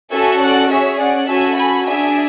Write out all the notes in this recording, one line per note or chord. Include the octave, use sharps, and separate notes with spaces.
C#4 F#4 A4 E5 G#5
D5 F#5
C#4 G#4 C#5 E5
D5 F#5
C#4 F#4 A4 E5 G#5
G#5 B5
D4 G#4 E5 G#5